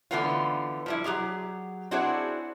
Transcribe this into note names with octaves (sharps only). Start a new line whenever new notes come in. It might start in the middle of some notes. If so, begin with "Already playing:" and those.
D3 E3 A3 B3 C#4 F4
F3 G3 E4
F#3 C4 G4 G#4
C4 D4 E4 F#4 G#4 C#5